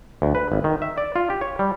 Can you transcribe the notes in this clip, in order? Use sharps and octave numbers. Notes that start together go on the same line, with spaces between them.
D2
B4
G#1
D#3
E5
D5
F4
G4
C#5
G3